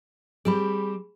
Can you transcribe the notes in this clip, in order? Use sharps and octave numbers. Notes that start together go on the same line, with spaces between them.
G3 C4 G#4 B5